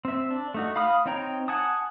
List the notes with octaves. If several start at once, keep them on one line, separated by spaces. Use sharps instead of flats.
C4 E5
D4
A3 D#4 F#4
F5 B5 D#6 F6
C4 D#4 C#5 G5 A#5
F#5 G#5 A5 D#6